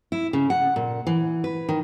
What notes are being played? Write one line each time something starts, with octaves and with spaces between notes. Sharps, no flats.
E4
C#3
F#5
A#2
E3
B4
D#3